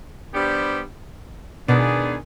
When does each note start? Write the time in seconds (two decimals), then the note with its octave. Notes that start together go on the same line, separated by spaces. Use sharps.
0.34 G3 B3 D4 G4 C5
1.68 B2 D#3 B3 D4 G#4